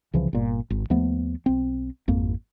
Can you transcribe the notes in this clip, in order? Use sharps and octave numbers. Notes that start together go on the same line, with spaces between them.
C2 C#3 E3 F3
G1 A#2
G#1
D#2 F3 A3 B3
B1 C4
G#1 F2 A#3